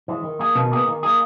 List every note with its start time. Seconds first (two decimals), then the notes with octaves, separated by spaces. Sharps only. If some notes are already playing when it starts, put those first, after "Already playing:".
0.08 E3 G#3
0.24 D#3
0.39 A#3 D#4 G#4
0.55 B2 D#3
0.71 A#3 D#4 G#4
0.88 D#3
1.03 A#3 D#4 G#4